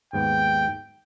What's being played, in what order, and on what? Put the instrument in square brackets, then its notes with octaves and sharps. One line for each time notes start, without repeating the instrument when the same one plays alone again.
[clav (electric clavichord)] D#2 G#2 B3 [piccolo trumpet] G5